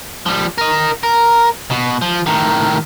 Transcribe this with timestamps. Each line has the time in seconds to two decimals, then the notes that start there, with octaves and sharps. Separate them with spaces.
0.26 F3 G3
0.58 A#4 D#5
1.03 A#4
1.71 B2
2.02 F3
2.26 A2 D#3